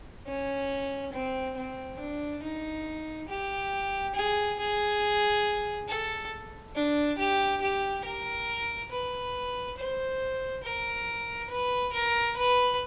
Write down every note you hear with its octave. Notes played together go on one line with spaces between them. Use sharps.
C#4
C4
C4
D4
D#4
G4
G#4
G#4
A4
D4
G4
G4
A#4
B4
C5
A#4
B4
A#4
B4